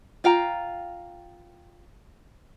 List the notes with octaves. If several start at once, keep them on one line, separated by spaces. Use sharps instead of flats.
F4 F5 G5 A#5